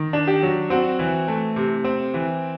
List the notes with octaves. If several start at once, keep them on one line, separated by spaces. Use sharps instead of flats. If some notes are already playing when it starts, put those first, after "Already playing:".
Already playing: D#3
D4
G4
F#3
C4 F#4
E3
A3
C3
C4
E3